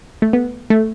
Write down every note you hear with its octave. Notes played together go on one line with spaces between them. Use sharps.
A3
B3
A3